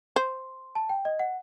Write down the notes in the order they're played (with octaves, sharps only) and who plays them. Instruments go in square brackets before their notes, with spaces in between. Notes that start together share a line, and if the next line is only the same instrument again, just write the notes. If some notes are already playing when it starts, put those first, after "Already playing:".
[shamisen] C5 [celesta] C6
[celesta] A5
G5
D#5
F#5